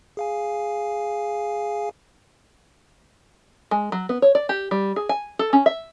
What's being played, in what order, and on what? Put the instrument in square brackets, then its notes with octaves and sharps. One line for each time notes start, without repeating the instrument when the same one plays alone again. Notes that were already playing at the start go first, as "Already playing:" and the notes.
[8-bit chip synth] G#4 F5 G#5
[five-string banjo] G#3
F#3
B3
C#5
D5
G4
G3
G#4
G#5
A4
C#4
E5